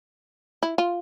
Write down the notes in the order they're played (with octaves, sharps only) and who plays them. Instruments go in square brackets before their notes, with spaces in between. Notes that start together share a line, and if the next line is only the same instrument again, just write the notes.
[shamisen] E4
F4